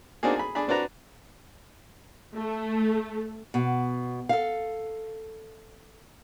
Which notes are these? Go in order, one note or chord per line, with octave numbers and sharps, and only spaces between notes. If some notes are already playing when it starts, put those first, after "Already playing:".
A#3 C4 D4 D#4 F#4 G#4
G#4 B5
D4 G#4 B5
C4 D4 F#4 B4 A#5
A3
B2
A4 F5